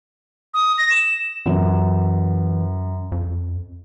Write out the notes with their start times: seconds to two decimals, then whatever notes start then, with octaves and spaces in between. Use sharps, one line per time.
0.54 D#6
0.78 A#6
0.90 E7
1.46 F#2 E3
3.12 F2